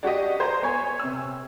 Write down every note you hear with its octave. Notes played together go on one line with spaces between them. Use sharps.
D4 F#4 G4 D#5
C5 A#5
B3 C#5 G#5
C3 E6